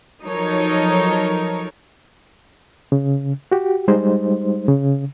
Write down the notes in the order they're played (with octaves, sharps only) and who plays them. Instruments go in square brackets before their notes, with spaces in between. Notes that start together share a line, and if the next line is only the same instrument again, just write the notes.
[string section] F3 F#3 D#4 A4 A#4 C#5
[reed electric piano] C#3
F#4 G4
G3 G#3 D#4 C5
C#3